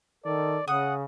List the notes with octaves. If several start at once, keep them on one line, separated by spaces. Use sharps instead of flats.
D#3 A4 D5
C#3 F#5 D#6